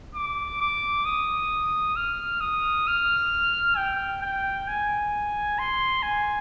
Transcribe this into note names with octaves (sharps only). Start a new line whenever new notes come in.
D6
D6
D#6
F6
D#6
F6
G5
G5
G#5
C6
G#5